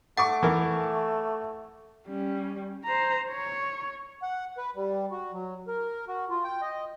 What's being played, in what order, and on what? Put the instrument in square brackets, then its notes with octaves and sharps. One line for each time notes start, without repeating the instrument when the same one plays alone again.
[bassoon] A3 [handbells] F#5 [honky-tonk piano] C#6 D6 A6
[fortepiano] E3 A#4
[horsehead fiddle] G3 C#4
C5 A#5
C#5
[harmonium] F#5
B4
G3
F#4
F#3
A#4
F#4
F4
G5
D#5